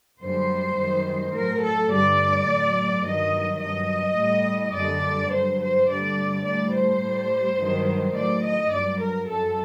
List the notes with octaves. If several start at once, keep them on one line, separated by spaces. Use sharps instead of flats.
F#2 D3 G3 C5
F#2 D#3 G3
A2 F#3 A#4
A4
G2 D3 G3 D5
A2 F#3
G2 D#3 F#3 D#5
G2 F#3 D#5
A2 G3
F#2 D3 G3 D5
G2 F#3 C5
C5
G2 D3 G3 D5
A2 G3 D5
C5
A2 G3
G2 D#3 F#3
A2 F#3 D5
D#5
G2 F#3 D5
A#4
F#2 F#3 A4